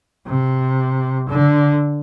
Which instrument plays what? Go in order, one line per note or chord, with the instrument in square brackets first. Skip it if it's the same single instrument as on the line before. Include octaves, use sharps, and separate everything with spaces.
[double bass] C3
D3